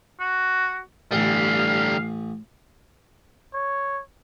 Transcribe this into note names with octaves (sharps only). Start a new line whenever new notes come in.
F#4
A1 D3 G3 F5 D#6
C#5